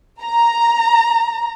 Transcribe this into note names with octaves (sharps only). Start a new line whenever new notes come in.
A#5